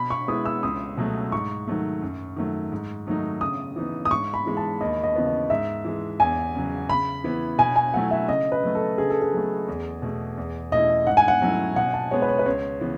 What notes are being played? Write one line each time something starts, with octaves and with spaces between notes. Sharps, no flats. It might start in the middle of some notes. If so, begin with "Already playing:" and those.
Already playing: B2 B5
C#6
G#3 B3 E4 D#6
E6
C#2 D#6
B2 F#3 A3
G#2 C#6
D#3 F#3 A3
F#2
D#3 F#3 A3
G#2
D#3 F#3 A3 D#4
C#3 D#6
E3 B3 D#4
D#6
G#2 C#6
B5
E3 G#3
A5
D#2 D#5
D#5
C#3 E3 B3
D#5
G#2 E5
E3 G#3
E2 G#5
C#3 F#3
C#3 B5
E3 B3 E4
B2 G#5
G#5
F#3 A3 E4 F#5
E5
C#3 D#5
B4
F#3 A3
A4
C#3 G#4
A4
G#4
F#3 A3
E2
B2 A3
E2
B2 A3 C#4 E4 D#5
G#2 F#5
G#5
F#5
F#3 A3 C#4 E4
B2 F#5
A5
G#3 B3 C#5
B4
C#5
B4
C#2 C#5
C#3 E3 B3